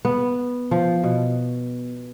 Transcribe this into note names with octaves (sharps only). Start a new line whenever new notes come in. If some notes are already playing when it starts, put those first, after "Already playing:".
B3
F3
B2